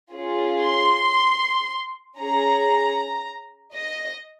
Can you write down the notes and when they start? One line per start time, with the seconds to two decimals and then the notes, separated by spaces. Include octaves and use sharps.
0.12 C#4 F4 G#4
0.64 C6
2.18 C#4 G#4 A#5
3.73 D#5